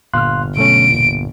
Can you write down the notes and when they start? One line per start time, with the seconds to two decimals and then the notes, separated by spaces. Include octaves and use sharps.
0.14 G1 A#2 F5 C6 F6 F#6
0.57 B2 F#3 A3 C#4 D7
0.89 E2 A#2